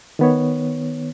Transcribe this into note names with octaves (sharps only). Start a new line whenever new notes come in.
D#3 B3 C#5